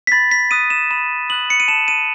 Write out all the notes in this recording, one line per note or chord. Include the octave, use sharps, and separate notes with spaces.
B6
B5 A6
B6
D#6 F#6 D#7
E7
B5 E7
D#6 F#6 F#7
C#7
D#7
A5 E7
D#7